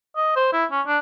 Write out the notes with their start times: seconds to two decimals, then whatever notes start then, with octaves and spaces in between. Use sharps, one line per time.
0.16 D#5
0.36 C5
0.53 E4
0.71 C#4
0.87 D4